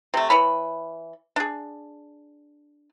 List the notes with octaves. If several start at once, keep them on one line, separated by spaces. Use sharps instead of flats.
C3 A3
E3 C#5 B5
D4 G#4